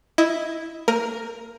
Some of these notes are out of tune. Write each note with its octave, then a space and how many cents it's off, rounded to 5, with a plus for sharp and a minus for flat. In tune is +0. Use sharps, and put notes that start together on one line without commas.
E4 +0 D#5 +15
A#3 -35 A#4 +5